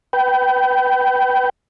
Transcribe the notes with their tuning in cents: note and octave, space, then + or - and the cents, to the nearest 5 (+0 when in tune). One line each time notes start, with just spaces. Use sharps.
B4 +0 G5 -25